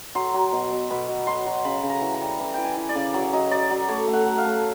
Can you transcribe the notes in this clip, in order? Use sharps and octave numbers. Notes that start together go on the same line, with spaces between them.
F#3 C6
F#3
B2
B2
B2 B5
B2
F#3 C6
F#3
C#3 B5
C#3
A#5
E3
A#5
G3
E3 A#5
E3 G5
G#5
E3
D5
C#3
F#3 C#5
F#3 D#5
F#3 D5
F#3 D5
A3 C#5
A3
F#5
F#3
F5
A3